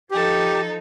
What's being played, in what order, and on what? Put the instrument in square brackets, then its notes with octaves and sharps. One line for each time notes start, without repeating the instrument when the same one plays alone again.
[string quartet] F3 D#4 A4 [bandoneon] G4